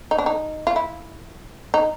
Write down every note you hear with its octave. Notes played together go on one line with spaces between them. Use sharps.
D#4
D4
D#4
F4
E4
D#4